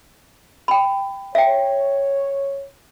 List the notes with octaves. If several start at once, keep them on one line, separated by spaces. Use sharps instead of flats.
G5 B5
C#5 E5 G5